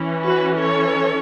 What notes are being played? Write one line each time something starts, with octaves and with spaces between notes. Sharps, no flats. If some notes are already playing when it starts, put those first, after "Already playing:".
Already playing: E3 C#4
F#4 B4
A4 C#5